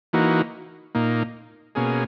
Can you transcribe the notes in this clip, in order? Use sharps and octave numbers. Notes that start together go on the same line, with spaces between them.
E3 A#3 D#4 F#4
A#2 A#3 D#4
B2 A#3 C#4 G#4